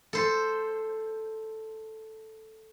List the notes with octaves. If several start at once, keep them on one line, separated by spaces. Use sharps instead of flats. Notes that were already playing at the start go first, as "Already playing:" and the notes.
A4 C5